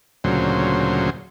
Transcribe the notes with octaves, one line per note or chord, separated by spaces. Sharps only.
D2 A#2 C#3 F#3 C5